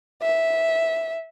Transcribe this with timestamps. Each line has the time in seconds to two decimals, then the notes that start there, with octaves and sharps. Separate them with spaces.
0.22 E5